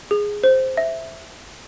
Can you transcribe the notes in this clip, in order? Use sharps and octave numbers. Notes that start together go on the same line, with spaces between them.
G#4
C5
E5